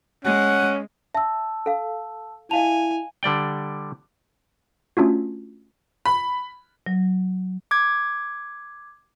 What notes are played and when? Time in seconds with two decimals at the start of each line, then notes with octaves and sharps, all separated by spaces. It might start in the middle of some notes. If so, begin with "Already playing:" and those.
0.25 G#3 C#4 F#5
1.15 E5 A5 E6
1.66 A4 F5
2.51 E4 D#5 F5 G#5 A5 F7
3.23 D3 G3 D5 G5
4.97 A3 C#4 D4 F4 F#4
6.05 B5
6.87 F#3
7.71 D6 G#6